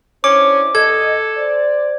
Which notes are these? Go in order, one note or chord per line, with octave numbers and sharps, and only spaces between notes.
C#4 D4 E4 C5 D6
G2 A4 D#5 G#6
C5 D5